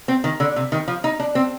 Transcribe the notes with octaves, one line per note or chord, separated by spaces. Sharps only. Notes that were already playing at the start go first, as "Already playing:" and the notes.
C4
D#3
D3
C3
D#3
F3
D#4
D4
C4